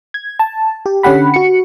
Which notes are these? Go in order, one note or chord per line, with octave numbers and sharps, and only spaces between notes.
G#6
A5
G4
D3 C#4 G4 F#5 B5
F#4 C#7